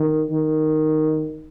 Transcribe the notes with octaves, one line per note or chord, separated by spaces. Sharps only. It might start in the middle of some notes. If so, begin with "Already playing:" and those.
Already playing: D#3
D#3